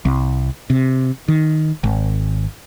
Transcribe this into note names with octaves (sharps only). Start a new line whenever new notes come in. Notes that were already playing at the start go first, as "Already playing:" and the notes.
C2
C3
D#3
G#1